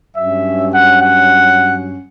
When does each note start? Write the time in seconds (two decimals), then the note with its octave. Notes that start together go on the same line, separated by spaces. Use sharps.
0.15 G2 F#3 C#4 E5
0.72 F#5
1.00 F#5